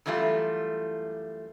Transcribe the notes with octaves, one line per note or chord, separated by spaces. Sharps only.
F#2 E3 G3 A3 F4